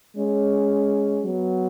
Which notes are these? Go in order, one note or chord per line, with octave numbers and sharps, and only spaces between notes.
G#3 C#4
F#3 B3